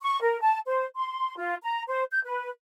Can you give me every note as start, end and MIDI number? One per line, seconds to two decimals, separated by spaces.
0.03 0.20 85
0.21 0.39 70
0.42 0.59 81
0.66 0.85 72
0.96 1.36 84
1.38 1.55 65
1.63 1.83 82
1.87 2.04 72
2.12 2.20 91
2.24 2.50 71